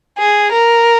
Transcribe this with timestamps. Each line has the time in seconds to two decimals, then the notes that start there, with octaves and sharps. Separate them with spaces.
0.18 G#4
0.52 A#4